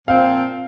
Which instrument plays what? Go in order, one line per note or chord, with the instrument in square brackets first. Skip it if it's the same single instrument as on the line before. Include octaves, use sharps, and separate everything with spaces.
[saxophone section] A#2 F3 C4 [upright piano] F5